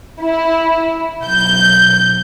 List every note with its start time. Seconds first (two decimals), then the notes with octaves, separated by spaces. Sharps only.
0.21 E4
1.22 B1 G6